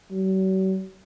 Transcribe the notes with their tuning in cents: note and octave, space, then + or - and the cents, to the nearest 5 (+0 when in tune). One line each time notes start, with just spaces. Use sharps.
F#3 +45